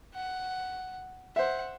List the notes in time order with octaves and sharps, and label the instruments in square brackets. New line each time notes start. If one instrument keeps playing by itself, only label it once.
[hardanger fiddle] F#5
[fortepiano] C5 E5 [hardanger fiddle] F#5